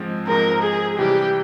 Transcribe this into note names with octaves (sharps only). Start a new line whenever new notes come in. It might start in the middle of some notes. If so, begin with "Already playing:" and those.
Already playing: G#2 F3 G#3 C4
G#2 F3 G#3 C4 A#4
G#4
C3 E3 G3 G4